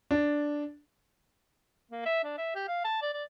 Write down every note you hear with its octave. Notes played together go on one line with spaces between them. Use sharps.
D4
A#3
E5
D4
E5
G4
F5
A5
D5
D5